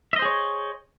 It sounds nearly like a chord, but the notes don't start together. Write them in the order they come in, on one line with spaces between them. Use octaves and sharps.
E5 D#5 C5 G#4 C#5